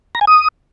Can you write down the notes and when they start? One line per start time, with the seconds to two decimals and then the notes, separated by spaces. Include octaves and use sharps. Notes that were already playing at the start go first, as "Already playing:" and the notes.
0.15 A#5
0.21 G#5
0.27 D#6